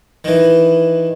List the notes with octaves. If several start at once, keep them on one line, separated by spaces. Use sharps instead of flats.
D#3 E3